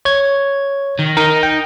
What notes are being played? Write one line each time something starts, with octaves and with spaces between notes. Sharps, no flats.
C#5 G#6
D#3
D#4 A#4
G5